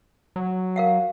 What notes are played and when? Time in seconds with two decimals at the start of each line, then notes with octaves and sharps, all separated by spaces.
0.36 F#3
0.76 A#4 F5 F#5